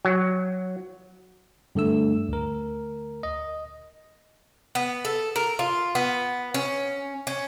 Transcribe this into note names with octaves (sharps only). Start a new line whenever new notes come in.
F#3
G2 D3 A3 E6
D2 A#4
D#5
B3
A4
A#4
F4
B3
C#4
C#4